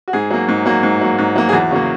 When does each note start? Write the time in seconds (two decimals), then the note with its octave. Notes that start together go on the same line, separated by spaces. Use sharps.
0.08 F#4
0.13 G#2 G#4
0.31 F#3 A#3
0.48 G#2
0.66 F#3 A#3
0.83 G#2
1.01 F#3 A#3
1.18 G#2
1.36 F#3 A#3
1.49 G#4
1.53 E2 F#4
1.71 C#3 F#3 A#3